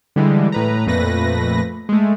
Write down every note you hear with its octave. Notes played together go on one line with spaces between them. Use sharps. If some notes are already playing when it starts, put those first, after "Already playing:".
D3 E3 G3 G#3
A2 B4 A#5
F2 A#2 A3 B4 A#6
G#3 A3